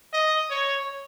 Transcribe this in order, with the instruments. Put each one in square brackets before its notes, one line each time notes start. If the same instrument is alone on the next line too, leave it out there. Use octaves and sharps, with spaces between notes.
[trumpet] D#5
C#5